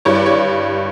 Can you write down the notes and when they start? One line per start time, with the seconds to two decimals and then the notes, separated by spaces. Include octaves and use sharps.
0.05 G2 C#5
0.15 D5
0.26 C#5